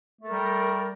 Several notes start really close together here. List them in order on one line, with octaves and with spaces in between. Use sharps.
A3 A4 A#4 G3